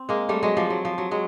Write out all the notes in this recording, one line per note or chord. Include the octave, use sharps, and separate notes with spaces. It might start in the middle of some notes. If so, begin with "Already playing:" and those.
Already playing: C4
G#3 A#3
G3 A3
F#3 G#3
F3 G3
F#3
F3
F#3
F#3 G#3